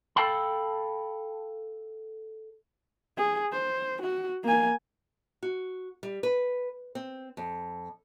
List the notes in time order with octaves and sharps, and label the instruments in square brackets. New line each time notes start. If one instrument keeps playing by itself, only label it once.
[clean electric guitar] A4 B4 F5 G5 A5 B5
[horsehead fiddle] G#4
C5
F#4
A#3 G#5
[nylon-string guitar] F#4
G3
B4
C4
F2